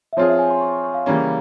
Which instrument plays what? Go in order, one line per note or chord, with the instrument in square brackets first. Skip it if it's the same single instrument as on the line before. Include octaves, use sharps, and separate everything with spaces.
[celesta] E5
[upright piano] F3 C4 F4 G#4 [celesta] C#5
[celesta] E5
G#5
C6
C#6
C#6
C#6
F5
[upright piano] C#3 E3 G3 A#3 C#4